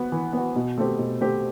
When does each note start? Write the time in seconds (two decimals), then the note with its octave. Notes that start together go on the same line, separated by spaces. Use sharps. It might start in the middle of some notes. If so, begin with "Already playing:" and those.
Already playing: B3 F#4
0.12 E3
0.33 B3 F#4
0.56 B2
0.78 A3 C4 G4
0.99 B2
1.21 A3 C4 G4